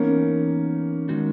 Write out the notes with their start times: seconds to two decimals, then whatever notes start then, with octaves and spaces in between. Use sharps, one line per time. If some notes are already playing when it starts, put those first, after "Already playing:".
Already playing: E3 A#3 B3 C#4 D#4 A#4
1.09 D#3 G#3 D#4 F#4